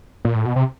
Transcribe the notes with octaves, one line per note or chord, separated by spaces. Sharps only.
A#2
A2
B2
C3